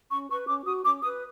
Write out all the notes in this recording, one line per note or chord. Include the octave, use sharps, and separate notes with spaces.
C#4 C#6
B4 C#6
C#4 D6
F#4 D#6
C#4 D6
B4 D#6